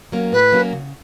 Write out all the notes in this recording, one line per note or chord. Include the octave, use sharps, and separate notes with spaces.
F#3 A#3 C#4 F#4
A2 B4
F#3 A#3 C#4 F#4
C#3